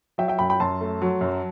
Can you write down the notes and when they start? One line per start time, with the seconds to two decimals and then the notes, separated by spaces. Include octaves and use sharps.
0.18 F#3 E5 G5
0.28 E5 G5
0.39 F#2 G5 B5
0.50 G5 B5
0.60 F#2 A5 C6
0.81 A3
1.02 F#3
1.21 F#2